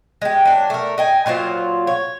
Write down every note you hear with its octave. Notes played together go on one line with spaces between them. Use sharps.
G#3 G4
F#3 D4
A3 A#4
D#5 G5 G#5
A#2 F#3 F4 C5
C#5